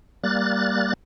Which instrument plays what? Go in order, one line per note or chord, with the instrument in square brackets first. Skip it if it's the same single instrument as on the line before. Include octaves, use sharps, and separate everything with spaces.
[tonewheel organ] G3 A#3 F#6 A6